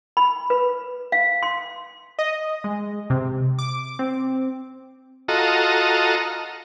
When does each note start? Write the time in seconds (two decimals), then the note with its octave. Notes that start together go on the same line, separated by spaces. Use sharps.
0.17 B5
0.50 B4
1.12 F5
1.43 C6
2.19 D#5
2.64 G#3
3.10 C3
3.59 D6
3.99 C4
5.28 F4 F#4 A4 D#5 A#5